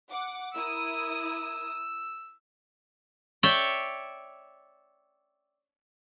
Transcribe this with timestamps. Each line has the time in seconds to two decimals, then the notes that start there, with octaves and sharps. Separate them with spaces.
0.10 F#5 D6
0.54 E4 A#4 D#6 E6
3.43 C#5 D5 E5 G5